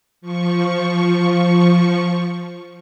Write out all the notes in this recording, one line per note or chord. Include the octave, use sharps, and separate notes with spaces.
F3 C#6